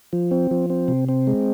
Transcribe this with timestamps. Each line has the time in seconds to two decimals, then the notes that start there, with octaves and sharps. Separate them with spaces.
0.13 F3
0.31 C4
0.51 F3
0.70 C4
0.88 C3
1.09 C4
1.27 G#3